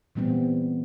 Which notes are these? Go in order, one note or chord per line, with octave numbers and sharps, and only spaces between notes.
A#2 E3 G3 B3 C4